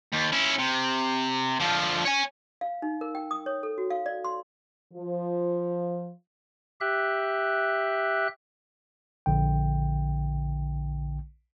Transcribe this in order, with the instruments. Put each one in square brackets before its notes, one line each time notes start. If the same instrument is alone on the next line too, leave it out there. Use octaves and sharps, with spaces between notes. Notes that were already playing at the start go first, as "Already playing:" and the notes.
[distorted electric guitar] D#2
C#4 E4
C3
D3 F3
C#5 G#5
[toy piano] F5
D#4
A#4
G5
D#6
C#5
A4
F#4
F5
D5
C6
[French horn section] F3
[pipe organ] G4 E5 F#6
[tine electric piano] A#1 D3 G5